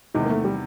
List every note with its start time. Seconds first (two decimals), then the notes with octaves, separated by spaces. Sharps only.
0.14 E2 C3 D#3 G#3
0.25 A#3
0.30 A3
0.44 G3